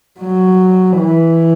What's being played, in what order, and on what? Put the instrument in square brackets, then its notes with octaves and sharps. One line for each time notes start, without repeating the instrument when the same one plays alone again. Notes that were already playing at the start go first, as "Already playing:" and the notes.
[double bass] F#3
E3